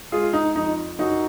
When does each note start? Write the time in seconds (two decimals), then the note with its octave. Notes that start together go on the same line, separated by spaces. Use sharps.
0.12 G#3 F4 G#4
0.33 D#4
0.56 F2 D#4
0.99 F#2 D#4 F#4